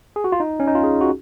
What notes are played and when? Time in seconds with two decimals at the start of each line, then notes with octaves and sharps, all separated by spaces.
0.16 G#4
0.24 F#4
0.32 F4
0.40 D#4
0.60 C#4
0.67 D#4
0.75 F4
0.84 G#4
1.01 F#4